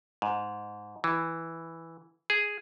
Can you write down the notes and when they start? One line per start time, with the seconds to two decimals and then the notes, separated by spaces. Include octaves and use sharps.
0.22 G#2
1.04 E3
2.30 G#4